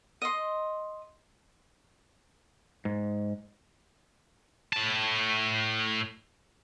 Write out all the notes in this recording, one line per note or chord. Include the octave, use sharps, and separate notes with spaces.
D#5 C6
G#2
A2 A5